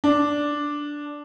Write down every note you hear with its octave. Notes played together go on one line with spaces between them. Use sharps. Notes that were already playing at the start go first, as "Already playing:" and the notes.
D4